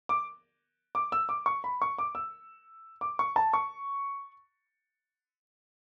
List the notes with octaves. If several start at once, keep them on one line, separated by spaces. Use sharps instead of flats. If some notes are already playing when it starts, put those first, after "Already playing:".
D6
D6
E6
D6
C#6
B5
C#6
D6
E6
D6
C#6
A5
C#6